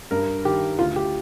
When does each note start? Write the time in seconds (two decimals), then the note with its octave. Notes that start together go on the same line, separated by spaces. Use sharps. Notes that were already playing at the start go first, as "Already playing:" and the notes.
0.11 G2 A#4
0.45 D#3 G4
0.79 D2 F4
0.96 G4